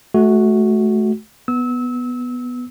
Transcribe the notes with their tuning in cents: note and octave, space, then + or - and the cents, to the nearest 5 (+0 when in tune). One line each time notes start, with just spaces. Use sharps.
A3 -30 F#4 +0
B3 +0 E6 -30